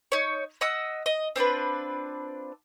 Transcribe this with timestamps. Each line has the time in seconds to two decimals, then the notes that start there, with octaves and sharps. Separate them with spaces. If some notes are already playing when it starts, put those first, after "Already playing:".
0.12 D#4 C#5
0.61 D#5 F#5 D#6 E6
1.06 D#5
1.36 C4 D4 F4 B4